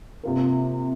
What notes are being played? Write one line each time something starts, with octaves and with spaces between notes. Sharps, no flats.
C3 A#3 F4 A#4